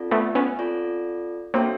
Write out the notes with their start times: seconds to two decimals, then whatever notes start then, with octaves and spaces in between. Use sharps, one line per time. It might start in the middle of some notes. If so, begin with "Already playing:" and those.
Already playing: C4 F4 A4 D5
0.11 A3 B3
0.35 B3 C#4
0.59 C4 F4 A4 D5
1.54 A#3 C4 D4 F#4 A4 C#5 E5